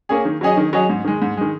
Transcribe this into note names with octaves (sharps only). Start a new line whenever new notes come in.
A#3 C#4 G#4
D#3
F#3 C#4 G#4 D#5
D#3
F#3 C#4 G#4 D#5
G#2
D#3 G#3
G#2
D#3 G#3